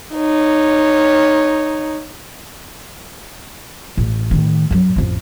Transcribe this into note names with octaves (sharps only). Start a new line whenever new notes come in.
D#4 C#5
A1
A2 D#3
F#2 F#3
A1 F2